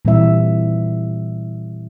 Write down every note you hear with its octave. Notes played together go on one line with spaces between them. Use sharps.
A#2 E3 G3 C4 E4 E5